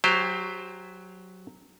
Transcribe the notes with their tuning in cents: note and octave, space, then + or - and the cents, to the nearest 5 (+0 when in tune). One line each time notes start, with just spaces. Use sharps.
F#3 +0 G4 +25 C5 +0